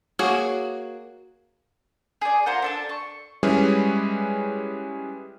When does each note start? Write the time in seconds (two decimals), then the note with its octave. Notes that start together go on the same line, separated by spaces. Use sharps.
0.19 A#3 F#4 G#4 C#5
2.21 G#4 D5
2.46 F4 A#4 C5 F#5
2.62 D4 A4 A5
2.89 C#6
3.43 G3 G#3 C#4 E4 G#4 B4